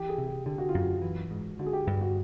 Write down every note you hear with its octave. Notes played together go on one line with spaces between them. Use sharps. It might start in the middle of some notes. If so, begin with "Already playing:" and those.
Already playing: E3 G4
G#4
C3
G4
D3 G4
F#4
F4
F#2
F#4
E3
G#2
D3 F#4
G#4
G4
G2 G4
F#4